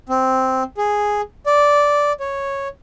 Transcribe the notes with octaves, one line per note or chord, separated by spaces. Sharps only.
C4
G#4
D5
C#5